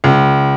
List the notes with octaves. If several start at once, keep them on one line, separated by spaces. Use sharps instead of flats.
C#2